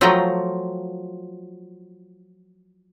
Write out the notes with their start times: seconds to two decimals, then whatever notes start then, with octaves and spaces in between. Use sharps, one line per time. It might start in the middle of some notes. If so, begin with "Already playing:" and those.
0.01 F3 F#3 A3 F4 G5 A#5